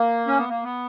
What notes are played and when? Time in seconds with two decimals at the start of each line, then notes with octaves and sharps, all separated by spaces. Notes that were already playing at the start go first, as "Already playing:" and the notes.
Already playing: A#3
0.27 C#4
0.38 B3
0.49 A#3
0.64 B3